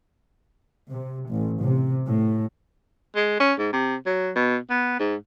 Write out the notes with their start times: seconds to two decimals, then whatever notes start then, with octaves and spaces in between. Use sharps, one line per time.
0.91 C3
1.29 A1
1.62 C3
2.06 A2
3.15 G#3
3.40 C#4
3.58 G#2
3.73 C3
4.06 F#3
4.36 B2
4.70 B3
5.00 G#2